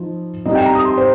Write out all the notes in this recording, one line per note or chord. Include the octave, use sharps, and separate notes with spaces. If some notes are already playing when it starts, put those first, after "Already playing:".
Already playing: F3 D#4
C3 G3 D#4 D#5
G5
A#5
D#6
C6
C5